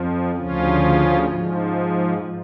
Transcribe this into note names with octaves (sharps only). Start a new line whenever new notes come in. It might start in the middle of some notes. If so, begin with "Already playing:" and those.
Already playing: F2 F3
D2 C#3 F3 C#4 F4
G#2 F3